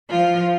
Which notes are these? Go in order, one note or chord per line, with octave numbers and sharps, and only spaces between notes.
F3 F4